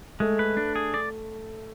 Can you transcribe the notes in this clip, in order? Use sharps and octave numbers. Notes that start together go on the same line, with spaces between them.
G#3 A3
B4
D4
G#4
D5